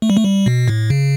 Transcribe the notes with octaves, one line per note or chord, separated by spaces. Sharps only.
A3
G3
A3
G3
B2
A2
C#3